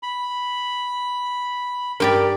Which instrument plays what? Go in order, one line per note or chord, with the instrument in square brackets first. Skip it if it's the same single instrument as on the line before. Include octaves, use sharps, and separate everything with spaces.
[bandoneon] B5
[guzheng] G2 G4 D5 [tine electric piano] A#4